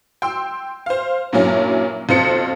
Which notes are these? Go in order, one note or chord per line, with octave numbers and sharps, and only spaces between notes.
G5 C6 E6
C5 F5
G2 A#2 F#3 C#4 E4
B1 F2 C5 C#7